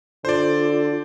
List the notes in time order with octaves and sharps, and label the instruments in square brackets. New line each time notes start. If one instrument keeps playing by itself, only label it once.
[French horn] D3 [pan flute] F4 [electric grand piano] C5 D5